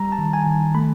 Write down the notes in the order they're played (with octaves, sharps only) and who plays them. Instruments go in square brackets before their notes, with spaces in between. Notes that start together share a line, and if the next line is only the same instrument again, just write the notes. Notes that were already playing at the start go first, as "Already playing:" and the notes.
Already playing: [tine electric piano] G3 A#5
A5
D#3
G#5
D#3
A3 B5